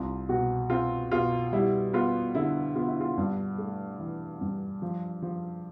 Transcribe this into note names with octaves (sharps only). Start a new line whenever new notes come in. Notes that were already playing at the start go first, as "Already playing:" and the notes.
Already playing: C2 F4
B2 F#4
C4 F4
B2 F4
G3 E4
B3 F4
D3 E4
B3 F4
E4
F4
G2
A3
E3
G2
F3
F3